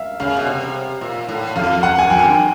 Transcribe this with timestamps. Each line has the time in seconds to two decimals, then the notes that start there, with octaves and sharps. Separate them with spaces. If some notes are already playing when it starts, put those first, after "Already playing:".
Already playing: E5 F5
0.20 C#3 F5
0.36 B2
0.47 C3
1.01 A#2
1.28 A2
1.56 F2 F5
1.83 F#5
1.98 G#5
2.10 F2 G5
2.28 G2